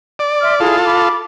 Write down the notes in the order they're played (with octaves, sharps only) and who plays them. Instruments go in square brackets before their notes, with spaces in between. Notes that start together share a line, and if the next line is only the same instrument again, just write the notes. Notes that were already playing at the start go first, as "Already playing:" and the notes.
[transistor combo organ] D5
[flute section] E5 C6 F6
[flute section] E4 G#4 [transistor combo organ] F4 A4
[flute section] B5 D6